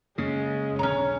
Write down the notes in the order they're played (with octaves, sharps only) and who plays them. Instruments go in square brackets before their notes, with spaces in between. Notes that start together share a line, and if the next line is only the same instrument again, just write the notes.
[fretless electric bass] F#2 A#3 [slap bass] C#3 [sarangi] G#3
[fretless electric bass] E1 B1 D3 [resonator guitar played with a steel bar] C#4 A#5 [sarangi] C#5